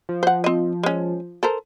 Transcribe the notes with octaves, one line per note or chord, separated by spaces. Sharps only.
F3
C5 F#5
C4 D#5
G#3 C#4
A4 A#4 C5